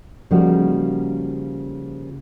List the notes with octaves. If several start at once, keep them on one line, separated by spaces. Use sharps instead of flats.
C#3 F3 G3 A#3 D#4 F#4